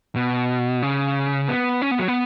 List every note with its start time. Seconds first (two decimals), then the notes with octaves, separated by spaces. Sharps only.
0.16 B2
0.83 C#3
1.49 B3
1.82 C#4
1.91 B3
1.99 F#3
2.08 B3